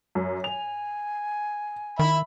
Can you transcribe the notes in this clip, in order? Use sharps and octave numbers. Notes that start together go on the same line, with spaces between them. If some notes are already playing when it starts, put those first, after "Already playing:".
F#2
G#5 F7
D#3 E5 B5